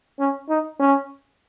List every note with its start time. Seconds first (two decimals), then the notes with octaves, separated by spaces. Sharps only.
0.19 C#4
0.49 D#4
0.80 C#4